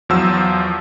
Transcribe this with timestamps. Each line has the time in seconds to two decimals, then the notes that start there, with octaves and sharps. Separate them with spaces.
0.09 E2 F3 F#3 F4 E6